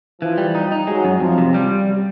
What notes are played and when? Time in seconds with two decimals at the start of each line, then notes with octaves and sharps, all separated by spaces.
0.21 E3 F3
0.38 G3
0.55 D#4
0.72 D#4
0.87 F#3 G#3
1.05 F#2
1.20 F2 F3
1.38 C3
1.54 G3